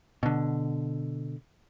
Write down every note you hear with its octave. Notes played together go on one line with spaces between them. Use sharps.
B2 D3